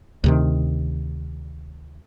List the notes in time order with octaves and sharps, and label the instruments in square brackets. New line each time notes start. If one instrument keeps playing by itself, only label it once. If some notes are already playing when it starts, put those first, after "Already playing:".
[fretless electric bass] D2 C3 D#3